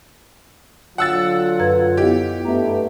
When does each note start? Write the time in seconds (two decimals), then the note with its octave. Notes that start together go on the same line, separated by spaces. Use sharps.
0.98 D3 F#3 F4 F#5 E6 A6
1.59 F#2 B4 G#6
1.97 B3 E4 G4 D#5
2.45 G2 A3 B3 A#5